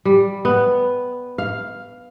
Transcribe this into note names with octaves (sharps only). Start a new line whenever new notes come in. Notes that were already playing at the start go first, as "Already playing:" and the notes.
G3
B3
F5